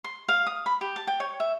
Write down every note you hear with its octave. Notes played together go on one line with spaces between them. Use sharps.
C6
F5
D#6
B5
G4
A5
G5
C#5
E5